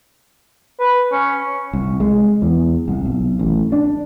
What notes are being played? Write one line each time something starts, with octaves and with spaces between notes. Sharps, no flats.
B4
C#4
C2
G#3
E2
C2
B1
A1
D4